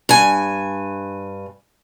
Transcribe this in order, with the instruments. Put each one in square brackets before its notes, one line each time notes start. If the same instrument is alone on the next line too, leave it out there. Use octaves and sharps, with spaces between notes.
[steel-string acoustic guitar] G2 G#5